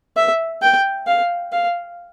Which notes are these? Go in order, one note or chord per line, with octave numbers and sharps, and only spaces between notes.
E5
G5
F5
F5